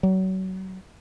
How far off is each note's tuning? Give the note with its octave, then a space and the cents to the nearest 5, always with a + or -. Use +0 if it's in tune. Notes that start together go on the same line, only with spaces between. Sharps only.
F#3 +30